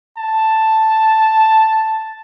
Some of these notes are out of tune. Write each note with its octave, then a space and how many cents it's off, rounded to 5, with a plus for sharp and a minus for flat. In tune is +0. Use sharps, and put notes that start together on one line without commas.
A5 +0